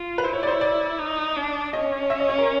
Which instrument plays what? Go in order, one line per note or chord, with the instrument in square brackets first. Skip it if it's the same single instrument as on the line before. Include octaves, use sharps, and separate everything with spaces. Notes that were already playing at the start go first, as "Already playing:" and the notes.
Already playing: [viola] F4
[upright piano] B4
[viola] E4 [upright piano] C5
[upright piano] C#5
D5
C5
C#5
D5
[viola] D#4
D4
[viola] C#4 [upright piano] D#5
[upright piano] E5
D#5
C#5
A#4